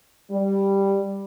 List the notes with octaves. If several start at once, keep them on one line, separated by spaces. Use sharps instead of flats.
G3